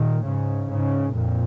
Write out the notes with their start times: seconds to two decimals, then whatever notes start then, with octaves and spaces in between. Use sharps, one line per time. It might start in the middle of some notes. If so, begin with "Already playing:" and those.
Already playing: A#2 D#3
0.25 G#2 C#3
0.70 G#2 C#3
1.15 F2 A#2